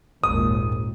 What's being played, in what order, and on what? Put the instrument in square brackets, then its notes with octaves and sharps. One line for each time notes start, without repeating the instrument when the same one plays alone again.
[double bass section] G#1 D#2 A#2 [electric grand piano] D#6